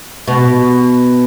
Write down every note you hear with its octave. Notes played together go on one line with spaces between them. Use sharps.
B2